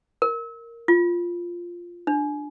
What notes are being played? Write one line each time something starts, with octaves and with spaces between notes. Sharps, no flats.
A#4
F4
D4